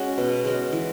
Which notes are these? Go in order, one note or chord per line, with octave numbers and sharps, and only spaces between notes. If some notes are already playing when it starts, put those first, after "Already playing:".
Already playing: G#3 C#4 F#4
B2
G#3 C#4 F#4
E3